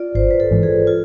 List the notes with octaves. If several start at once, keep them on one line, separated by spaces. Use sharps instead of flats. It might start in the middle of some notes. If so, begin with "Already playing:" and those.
Already playing: F4 D5
G#1 C5
B4
A4
G#2 E3
G#4
F4